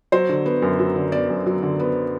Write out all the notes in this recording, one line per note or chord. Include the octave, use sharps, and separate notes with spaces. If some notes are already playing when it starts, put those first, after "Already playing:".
F#3 C5
D3
B3
F#2
F#3
D3
B3 D5
F#2
F#3
D3
B3